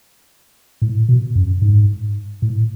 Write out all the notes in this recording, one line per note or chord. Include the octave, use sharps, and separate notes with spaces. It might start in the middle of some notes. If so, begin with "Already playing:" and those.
A2
B2
F#2
G#2
A2